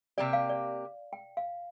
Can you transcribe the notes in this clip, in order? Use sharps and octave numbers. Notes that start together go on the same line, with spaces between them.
C3 A#3 G4 D5
F5
D5
G5
F5